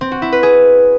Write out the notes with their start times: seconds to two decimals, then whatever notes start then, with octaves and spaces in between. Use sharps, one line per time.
0.01 C4
0.11 F#4
0.22 E4
0.32 B4
0.43 G#4